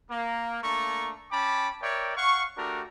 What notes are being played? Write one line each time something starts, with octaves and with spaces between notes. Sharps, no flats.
A#3
A3 A#3 D4 A#5 C#6
C#4 G5 A5 B5 D6
A#4 C#5 D5 E5 G5
F5 F#5 C#6
A3 D4 F#4 G4 A#4